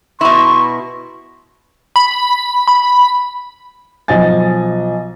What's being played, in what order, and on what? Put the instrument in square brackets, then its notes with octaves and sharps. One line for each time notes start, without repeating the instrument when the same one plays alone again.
[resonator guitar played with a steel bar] B2 E4 [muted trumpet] C6 [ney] C#6
[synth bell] B5
B5
[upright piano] B1 F3 D#5 G#5 A6